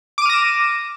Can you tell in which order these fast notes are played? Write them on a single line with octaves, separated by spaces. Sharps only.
D6 D#7 F6 A#6 E7